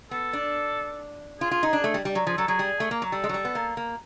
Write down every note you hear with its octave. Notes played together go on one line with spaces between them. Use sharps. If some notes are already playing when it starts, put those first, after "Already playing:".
B3 A4
D4
F4 G#4
F4
D#4
D4
A3
G3
G3
F#3
F3 G#4
F#3 A4
F#3 G#4
G3
A3
A#3
F#3
G3 A4
G#3
F#3
G3
B3
A#3
A#3